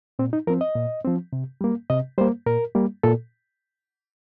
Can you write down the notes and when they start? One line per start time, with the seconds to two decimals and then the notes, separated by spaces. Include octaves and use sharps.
0.19 A#2 C4
0.33 D#4
0.47 F3 A#4
0.50 C4
0.61 D#5
0.76 A#2
1.05 F3 C4
1.33 C3
1.61 G3 A#3
1.90 C3 D#5
2.18 G3 A#3 C5
2.46 A#2 A#4
2.75 G3 A#3
3.03 A#2 A4